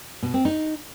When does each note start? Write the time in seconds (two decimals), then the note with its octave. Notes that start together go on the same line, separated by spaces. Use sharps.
0.23 B2
0.34 C4
0.45 D#4